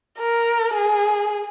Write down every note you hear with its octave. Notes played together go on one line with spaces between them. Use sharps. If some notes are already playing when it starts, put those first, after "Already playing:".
A#4
G#4